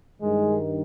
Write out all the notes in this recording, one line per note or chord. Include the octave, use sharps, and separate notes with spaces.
G2 D#3 G#3